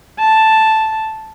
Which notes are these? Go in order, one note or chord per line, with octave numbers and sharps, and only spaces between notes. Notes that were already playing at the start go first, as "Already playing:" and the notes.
A5